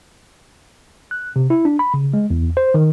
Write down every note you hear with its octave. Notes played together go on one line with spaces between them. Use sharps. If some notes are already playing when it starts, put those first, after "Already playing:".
F#6
C3
E4
D4
B5
C#3
G#3
E2
C5
D#3